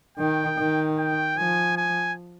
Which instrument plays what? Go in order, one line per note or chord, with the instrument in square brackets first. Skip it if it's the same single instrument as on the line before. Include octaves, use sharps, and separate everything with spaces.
[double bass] D#3 [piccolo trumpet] G5
[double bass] D#3
[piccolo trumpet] G5
[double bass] F3 [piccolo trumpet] G#5
[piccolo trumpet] G#5